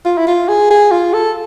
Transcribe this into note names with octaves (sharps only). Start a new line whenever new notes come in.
F4
E4
F4
G#4
G#4
F4
A4